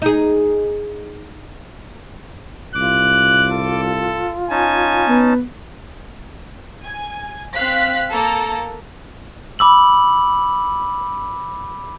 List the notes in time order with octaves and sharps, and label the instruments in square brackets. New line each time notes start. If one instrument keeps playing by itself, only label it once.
[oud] D#4 G#4
[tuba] C2 [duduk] F4 [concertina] D6 [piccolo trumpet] F#6
[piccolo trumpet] A4
[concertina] C#4 D#4 A5 [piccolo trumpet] G#5
[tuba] B3 [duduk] B4
[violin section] G#5
C4 F5 F#6 B6
A#3 A4 A#5
[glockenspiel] B5 D6 E6 F#7